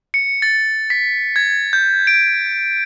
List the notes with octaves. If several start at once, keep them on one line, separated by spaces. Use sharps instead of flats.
C#7
A6
B6
G#6
G6
D7